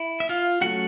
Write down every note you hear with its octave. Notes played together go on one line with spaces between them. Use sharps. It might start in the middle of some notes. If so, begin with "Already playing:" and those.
Already playing: E4
E5
F4 F5
F#3 A3 C#4 F#4 F#5